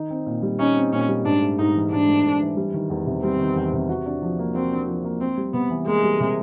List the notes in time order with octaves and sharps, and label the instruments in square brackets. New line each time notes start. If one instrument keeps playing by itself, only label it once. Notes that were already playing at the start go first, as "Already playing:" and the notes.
Already playing: [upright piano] D#3 D#4
C4
A#2
G3
[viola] C#4 [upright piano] D#4
[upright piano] C4
[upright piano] A#2 [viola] C#4
[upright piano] G3
[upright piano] G#2 [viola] D4
[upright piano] A3
[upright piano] G#2 [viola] D#4
[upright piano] E3
[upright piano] G#2 [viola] D4
[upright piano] A3
G#2
E3
G3
D#3
E2
C3
[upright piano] G3 [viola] C4
[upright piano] D#3
E2
C3
F#4
D4
F3
A#3
[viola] C4 [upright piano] F#4
[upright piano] D4
F3
A#3
[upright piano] A#3 [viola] C4
[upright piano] G3
[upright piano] C3 [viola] B3
[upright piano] E3
[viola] G#3 [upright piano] A#3
[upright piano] G3
C3